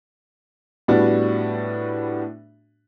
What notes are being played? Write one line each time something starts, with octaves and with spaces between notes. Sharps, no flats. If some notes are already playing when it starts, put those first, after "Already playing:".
A2 G3 B3 D4 F#4